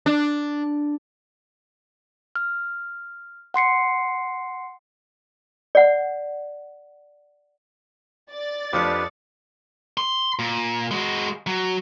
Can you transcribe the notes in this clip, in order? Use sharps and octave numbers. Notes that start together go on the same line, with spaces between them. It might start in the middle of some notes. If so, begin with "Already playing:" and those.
D4
F6
F#5 C6 C7 C#7
D5 F#5
D5 A6
F2 F3 D4 G4 B4 D6 D#6 C#7
C6
A#2
G#3 F#4
F#3